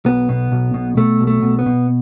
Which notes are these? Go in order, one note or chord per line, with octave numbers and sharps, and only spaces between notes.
B1 B3
B2
B1
B2
B2 A3
B1
A3
B2
B3
B2